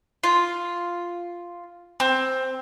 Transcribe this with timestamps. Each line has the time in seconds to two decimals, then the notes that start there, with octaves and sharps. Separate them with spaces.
0.24 F4
2.00 C4